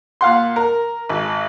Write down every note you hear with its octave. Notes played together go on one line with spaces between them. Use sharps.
A#2 F5 F#5 C6
A#4
G#1